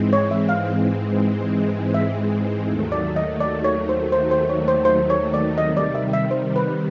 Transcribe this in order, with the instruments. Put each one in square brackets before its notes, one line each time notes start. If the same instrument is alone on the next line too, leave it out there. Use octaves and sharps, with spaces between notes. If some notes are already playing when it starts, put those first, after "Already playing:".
Already playing: [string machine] G#2 E3 G#3 C4
[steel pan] C#5
E5
F5
E5
[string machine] D#2 D#3 F#3 A3
[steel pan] D5
D#5
D5
C#5
C5
C5
C5
C#5
C5
C5
C#5
D5
[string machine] C3 D#3 G3 [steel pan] D#5
[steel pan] D5
E5
E5
C5
B4